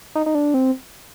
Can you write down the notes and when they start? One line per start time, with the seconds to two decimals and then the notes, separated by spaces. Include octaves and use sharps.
0.15 D#4
0.26 D#4
0.35 D4
0.54 C4